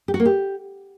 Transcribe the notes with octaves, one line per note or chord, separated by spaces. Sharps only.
G4
F#4
A#3
G4